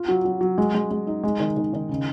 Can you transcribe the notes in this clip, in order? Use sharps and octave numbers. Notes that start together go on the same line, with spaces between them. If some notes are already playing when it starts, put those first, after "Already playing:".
Already playing: F4
F#3
F#3
F#3
G#3
G#3
G#3
D#4
G#3
D#3
D#3
D#3
C#3